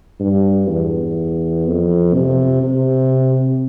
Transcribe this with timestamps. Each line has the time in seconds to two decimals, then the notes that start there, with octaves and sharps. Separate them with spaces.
0.20 G2
0.69 E2
1.67 F2
2.15 C3
2.63 C3